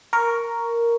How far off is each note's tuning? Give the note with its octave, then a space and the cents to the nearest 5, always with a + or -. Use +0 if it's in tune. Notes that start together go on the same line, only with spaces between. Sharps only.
A#4 +0 C#6 +10